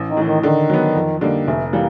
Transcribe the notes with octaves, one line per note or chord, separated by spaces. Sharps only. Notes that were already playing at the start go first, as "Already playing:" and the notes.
Already playing: A1
D#3
A2 E3
D#3
D3 D#3
F#3 B3
F2
D3 G3 A#3 D#4
F1 A3
E3 G3 A#3